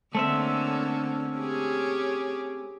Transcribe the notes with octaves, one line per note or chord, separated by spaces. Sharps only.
D3 A3 A#3 C4 C#4 E5
C#4 G4 G#4